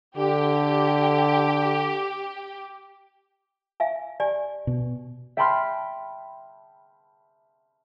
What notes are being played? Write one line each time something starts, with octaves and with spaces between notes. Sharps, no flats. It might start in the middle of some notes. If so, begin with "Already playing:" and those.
D3 G4
E5 F5 G#5
G4 D5 G#5
B2
E5 G5 A5 B5 C6 F6